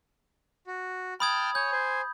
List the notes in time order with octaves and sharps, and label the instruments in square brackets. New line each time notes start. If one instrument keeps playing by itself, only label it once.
[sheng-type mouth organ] F#4
[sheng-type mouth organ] G5 A5 F6 [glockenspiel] B5 D#6 G#6
[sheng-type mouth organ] C#5 G#5 [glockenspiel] G6
[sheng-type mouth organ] C5 G#5